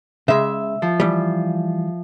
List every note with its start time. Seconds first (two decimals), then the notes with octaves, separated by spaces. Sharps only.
0.28 C#3 G#3 E5
0.82 F3
1.00 E3 G3